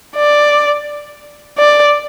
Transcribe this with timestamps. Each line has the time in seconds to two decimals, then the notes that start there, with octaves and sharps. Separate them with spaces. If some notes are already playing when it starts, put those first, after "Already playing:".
0.16 D5
1.58 D5